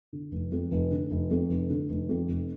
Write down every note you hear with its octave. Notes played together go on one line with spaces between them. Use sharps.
D3
F1
F2
F1
D3
F1
F2
F1
D3
F1
F2
F1